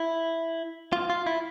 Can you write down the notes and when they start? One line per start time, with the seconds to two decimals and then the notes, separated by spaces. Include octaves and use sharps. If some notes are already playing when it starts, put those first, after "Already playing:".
Already playing: E4
0.93 F4
1.10 F4
1.27 E4